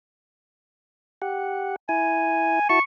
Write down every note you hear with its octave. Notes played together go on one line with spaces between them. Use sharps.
G4 F#5
E4 G#5
E4 F#4 A5 C#6